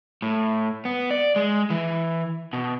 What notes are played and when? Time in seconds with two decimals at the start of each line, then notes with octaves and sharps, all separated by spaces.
0.22 A2
0.85 B3
1.11 D5
1.36 G#3
1.70 E3
2.53 B2